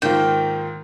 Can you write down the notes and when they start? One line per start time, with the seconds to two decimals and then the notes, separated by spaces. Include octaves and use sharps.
0.02 G#2 D#3 A#3 F4 G5